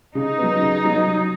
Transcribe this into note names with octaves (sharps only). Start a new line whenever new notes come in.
C#3 D#4
F#3 B3
C#3
F#3 B3
F#3